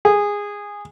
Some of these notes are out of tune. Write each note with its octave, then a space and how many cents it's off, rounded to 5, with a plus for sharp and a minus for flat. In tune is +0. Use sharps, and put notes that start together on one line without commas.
G#4 -15